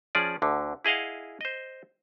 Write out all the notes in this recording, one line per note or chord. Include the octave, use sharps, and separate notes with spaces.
F3 C#4 G#4 D5
D2 D3
E4 G#4 D#5 F5 F#5
C5 D#5